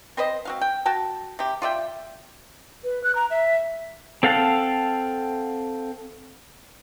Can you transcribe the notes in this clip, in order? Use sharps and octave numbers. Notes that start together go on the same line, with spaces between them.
C4 B4 C5 D#5
C4 F#4 F5
G5
F#4 G5 A5
C3 G4
F4 D5 E5 G5
B4
F#6
A#5
E5
C4 A4 F5 F#5 A5